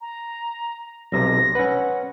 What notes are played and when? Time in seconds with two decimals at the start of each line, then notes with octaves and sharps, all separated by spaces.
0.01 A#5
1.12 B1 C3 A#6
1.55 C#4 B4 F#5